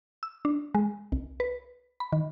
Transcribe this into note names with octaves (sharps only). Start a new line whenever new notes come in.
E6
D4
G#3
C2
B4
B5
D#3